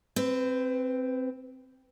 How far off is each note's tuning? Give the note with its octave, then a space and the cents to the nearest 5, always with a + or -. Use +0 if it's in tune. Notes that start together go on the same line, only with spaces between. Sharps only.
C4 +0 B4 +30